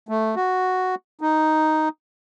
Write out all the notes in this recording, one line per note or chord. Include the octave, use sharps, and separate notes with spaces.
A3
F#4
D#4